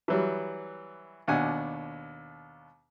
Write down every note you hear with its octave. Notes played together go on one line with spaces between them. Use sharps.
E3 F#3 G3
D#2 B2 D4 F#5 G#5